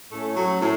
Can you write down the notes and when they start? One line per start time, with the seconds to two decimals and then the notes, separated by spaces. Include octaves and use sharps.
0.12 A2 A3 C#4
0.36 F#3 A3
0.60 A2